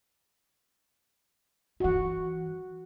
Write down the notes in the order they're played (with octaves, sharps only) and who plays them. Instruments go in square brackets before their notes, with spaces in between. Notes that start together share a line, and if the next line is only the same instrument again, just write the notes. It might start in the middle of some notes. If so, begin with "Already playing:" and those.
[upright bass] G2 E3 [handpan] F#4 F#5